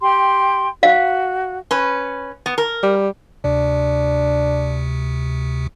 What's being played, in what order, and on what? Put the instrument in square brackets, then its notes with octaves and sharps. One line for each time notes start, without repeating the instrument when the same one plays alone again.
[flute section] G4 G5 C6
[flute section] F#4 [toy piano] F5
[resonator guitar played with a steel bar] C#4 B4
B3
A#4
[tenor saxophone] G3
[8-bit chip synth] D2 C3 [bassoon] D4